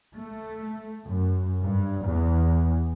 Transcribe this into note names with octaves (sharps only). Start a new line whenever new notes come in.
A3
F#2
G2
E2